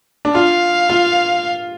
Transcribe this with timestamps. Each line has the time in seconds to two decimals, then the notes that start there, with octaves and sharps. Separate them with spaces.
0.25 D4
0.35 F4 F5
0.90 F4